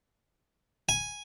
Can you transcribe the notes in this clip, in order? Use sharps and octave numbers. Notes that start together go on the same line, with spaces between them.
G#5